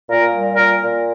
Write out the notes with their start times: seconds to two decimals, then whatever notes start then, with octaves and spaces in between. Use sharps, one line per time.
0.09 A#2 A#4
0.33 G3
0.57 A#2 A#4
0.80 A#2